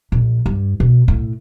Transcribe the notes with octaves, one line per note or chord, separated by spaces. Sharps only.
A#1
G2
B2
A2